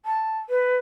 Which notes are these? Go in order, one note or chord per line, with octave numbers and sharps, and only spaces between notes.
A5
B4